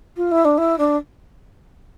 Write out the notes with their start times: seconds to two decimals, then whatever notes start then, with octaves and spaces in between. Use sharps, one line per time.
0.16 F4
0.31 E4
0.44 D4
0.57 E4
0.78 D4